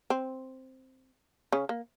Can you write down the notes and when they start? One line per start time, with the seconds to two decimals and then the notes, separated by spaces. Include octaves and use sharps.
0.10 C4
1.52 C#3 C#4
1.69 A#3